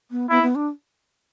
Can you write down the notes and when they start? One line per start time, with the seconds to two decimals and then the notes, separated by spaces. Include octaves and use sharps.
0.11 B3
0.30 B3 E4
0.42 B3
0.55 D4